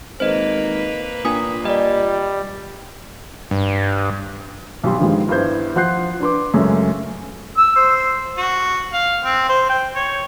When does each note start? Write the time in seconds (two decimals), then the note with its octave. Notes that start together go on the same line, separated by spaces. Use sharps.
0.20 G#1 A#3 B4 C5 D#5
1.25 A#2 D4 G#5 D#6
1.65 G3 D5 D#5
3.51 G2
4.83 B1 G3 C6
4.99 G2 D3 D#3 F3 G3 G#3
5.29 G2 B3 E4 C5 G6 G#6
5.76 F3 F#5 C6 F#6 G6 C7
6.20 D4 B4 C6 D6
6.54 F#2 C#3 G#3 A3 C#4
7.57 E6
7.76 C5
8.37 F#4
8.93 F5
9.24 C4
9.49 C5
9.69 G5
9.95 C#5